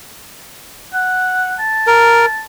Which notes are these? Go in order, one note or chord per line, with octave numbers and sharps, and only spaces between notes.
F#5
A5
A#4